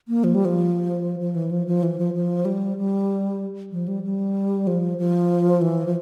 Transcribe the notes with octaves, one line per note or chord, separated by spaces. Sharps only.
A#3
F3
G3
F3
F3
E3
F3
F3
E3
F3
F3
G3
G3
F3
G3
G3
F3
F3
E3
F3